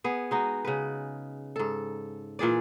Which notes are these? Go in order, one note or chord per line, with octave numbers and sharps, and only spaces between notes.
B3 G#4
G#3 D#4 F#4
C#3 B4
G#2 A4
A#2 E3 G#4 D5